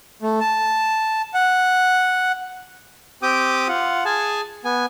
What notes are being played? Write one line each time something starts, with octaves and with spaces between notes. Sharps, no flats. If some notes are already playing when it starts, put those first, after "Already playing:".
A3
A5
F#5
C4 G4 G5 D6 D#6
F4 F#5
G#4 G#5 A5
B3 G#5